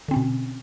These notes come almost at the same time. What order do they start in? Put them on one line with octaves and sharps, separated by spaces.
D3 C4 C#4 B2